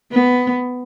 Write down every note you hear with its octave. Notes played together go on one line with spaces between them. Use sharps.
B3